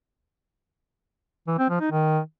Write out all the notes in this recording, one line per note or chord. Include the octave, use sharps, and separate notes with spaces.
E3
C4
F3
D#4
D#3